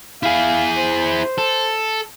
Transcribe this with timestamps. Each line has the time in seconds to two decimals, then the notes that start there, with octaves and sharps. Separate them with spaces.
0.23 E4 G#4 F5
0.77 C5
1.38 A4